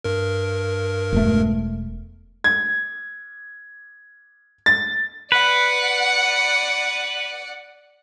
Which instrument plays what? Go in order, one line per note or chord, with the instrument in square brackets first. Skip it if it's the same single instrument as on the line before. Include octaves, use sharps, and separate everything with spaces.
[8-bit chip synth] G2 A#4
[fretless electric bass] E1 A3
[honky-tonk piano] G#6
A6
[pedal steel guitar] B4 [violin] D5 F#5